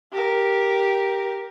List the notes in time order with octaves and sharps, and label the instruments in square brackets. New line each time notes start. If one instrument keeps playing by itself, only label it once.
[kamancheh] G4 A#4